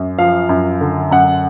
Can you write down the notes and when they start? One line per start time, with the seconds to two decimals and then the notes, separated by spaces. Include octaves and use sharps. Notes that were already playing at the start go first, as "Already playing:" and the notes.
Already playing: F#2
0.18 F3 F5
0.49 F#2
0.81 D3
1.11 F#2 F#5